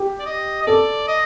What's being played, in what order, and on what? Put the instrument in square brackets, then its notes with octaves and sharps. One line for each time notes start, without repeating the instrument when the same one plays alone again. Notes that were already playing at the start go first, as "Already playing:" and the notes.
Already playing: [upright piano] G4
[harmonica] D5
D#5
D#5
[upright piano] A4 [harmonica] D5
[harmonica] D#5